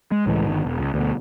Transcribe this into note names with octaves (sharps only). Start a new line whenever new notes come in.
G#3
C#2 A2 E3 G#3
G1 D#3
E1
C#2
D2 B2